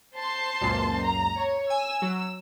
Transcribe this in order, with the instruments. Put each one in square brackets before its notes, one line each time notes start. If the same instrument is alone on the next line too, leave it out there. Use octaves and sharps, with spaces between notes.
[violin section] C5 A5 C6
[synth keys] C#2 F#2 A#2
[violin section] A#5
C#5
[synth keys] G#5 [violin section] E6
[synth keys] F#3